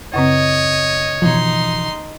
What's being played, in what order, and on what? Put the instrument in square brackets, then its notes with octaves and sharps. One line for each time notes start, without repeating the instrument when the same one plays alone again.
[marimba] F#2 C#3 C4 [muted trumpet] C#5 [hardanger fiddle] D#5
[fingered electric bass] B2 E3 F3 [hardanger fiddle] D#4 C6